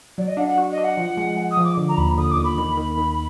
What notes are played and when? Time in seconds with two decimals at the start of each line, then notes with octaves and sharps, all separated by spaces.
0.18 F#3 D5
0.27 D#5
0.37 D4 F#5
0.48 F#5
0.58 F#4
0.71 D#5
0.78 D4
0.84 F#5
0.97 F3
1.17 G#3
1.37 G#3
1.51 D#6
1.57 F3
1.64 D6
1.77 D3
1.88 A#5
1.97 D#2 B5
2.17 D3 D#6
2.31 D6
2.37 D#2
2.44 B5
2.58 D#3
2.77 D#3
2.98 D#3